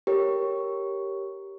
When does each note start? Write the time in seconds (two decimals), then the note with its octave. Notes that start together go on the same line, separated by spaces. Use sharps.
0.07 G4 A#4 C#5